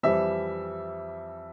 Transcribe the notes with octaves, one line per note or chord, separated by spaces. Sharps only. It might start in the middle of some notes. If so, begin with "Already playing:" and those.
F2 E3 G3 E5